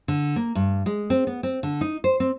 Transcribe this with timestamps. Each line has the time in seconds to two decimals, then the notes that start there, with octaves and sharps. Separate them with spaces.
0.08 D3
0.36 A#3
0.55 G2
0.86 G#3
1.10 C4
1.27 B3
1.43 C4
1.63 D3
1.81 D#4
2.04 C5
2.20 C4